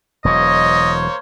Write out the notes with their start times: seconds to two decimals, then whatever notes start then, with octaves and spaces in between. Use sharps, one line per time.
0.25 E1 E3 F#3 A#3 C5 C#5 D#5